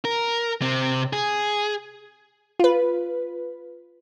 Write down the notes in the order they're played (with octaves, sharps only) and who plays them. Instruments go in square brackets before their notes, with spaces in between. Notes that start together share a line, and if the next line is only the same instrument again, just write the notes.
[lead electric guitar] A#4
C3 C4
G#4
[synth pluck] F4 B4